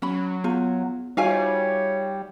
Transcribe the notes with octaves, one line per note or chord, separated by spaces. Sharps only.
F#3 C#4 B5
B3 F4
G3 D#4 F4 F#4 C#5 E5 F5 G#5